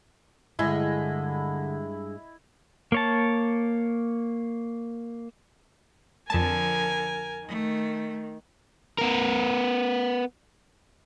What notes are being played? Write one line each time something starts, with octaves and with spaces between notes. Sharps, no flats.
G2 D3 G#3 E4 D#5
A#3 C#5 A5
F2 D3 F3 A#4 G#5 A5
D#3 A3
B3 A#4